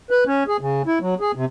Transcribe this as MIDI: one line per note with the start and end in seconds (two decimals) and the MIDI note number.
0.10 0.24 71
0.27 0.44 61
0.48 0.57 68
0.61 0.82 49
0.87 0.99 64
1.01 1.14 54
1.20 1.32 68
1.35 1.45 48